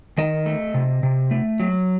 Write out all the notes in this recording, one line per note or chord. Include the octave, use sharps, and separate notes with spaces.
D#3 D#5
A3
C3
C3
A3
F#3